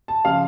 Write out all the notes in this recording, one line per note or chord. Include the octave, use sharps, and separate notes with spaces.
A5
C#3 F3 F5